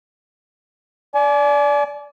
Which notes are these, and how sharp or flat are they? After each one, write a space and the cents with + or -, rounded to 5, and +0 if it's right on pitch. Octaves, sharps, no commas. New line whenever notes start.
D5 -15 G#5 +40